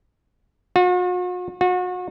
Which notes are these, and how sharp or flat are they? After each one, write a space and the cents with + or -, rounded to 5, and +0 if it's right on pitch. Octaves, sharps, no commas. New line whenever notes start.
F#4 -45
F#4 -35